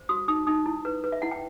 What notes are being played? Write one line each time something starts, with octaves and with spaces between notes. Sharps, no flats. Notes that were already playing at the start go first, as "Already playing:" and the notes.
Already playing: C5
F#4 D#6
D#4 D#6
D#4 D#6
E4
B4
B4
E5
E4 F#5
G5